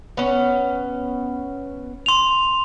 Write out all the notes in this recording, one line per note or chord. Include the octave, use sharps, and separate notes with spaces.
B3 C#4
C6 F7